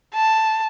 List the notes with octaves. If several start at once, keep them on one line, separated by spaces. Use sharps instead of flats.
A5